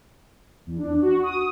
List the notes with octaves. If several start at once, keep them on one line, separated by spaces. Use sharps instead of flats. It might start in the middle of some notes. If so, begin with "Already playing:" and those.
E2
D4
F#4
D#6